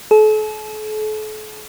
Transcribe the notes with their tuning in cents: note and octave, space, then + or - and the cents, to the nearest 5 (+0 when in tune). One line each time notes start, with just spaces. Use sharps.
A4 -40